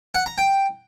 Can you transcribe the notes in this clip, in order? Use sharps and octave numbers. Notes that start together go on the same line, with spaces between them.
F#5
A#5
G5